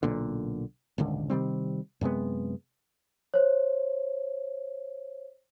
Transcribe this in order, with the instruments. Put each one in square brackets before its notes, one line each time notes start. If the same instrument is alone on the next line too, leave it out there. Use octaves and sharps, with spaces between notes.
[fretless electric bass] B1 A#2 D3
D#1 G#1 C#2 D3
C3 D#3 G3 C4
F#2 C3 G#3 B3
[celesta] C5 C#5